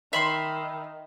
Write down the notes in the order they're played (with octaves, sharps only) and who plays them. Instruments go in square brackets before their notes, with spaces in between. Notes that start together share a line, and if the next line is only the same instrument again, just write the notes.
[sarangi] D#3 [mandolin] E5 B5 C6